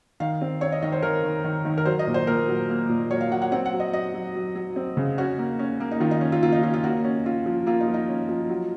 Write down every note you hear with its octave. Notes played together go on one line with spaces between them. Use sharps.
D#3 F5
C4
C4 C#5
D#5
D#3 D#5
C5
D#3 A#4
D#3
D#3
D#3
A#4
F#3 C5
D#5
A#2
C5
A#2 A#4
F#3
A#3
A#2
F#3 C#5
F5
F#3 F#5
F#5
C4 F#5
F#5
F#3
D#5
F#3 D#5
F#3
F#3
F#3
C4
C#3
C#4 F#4
A#3
C#4
A#3
D#4
D#3 F4
D#4
C#4
F4
A#3 F4
D#4
C#4 F4
F4
A#3 F#4
C#4
C#4 F4
F3
A#3 F4
D#4
F3
D#4
C#4
F3
F#3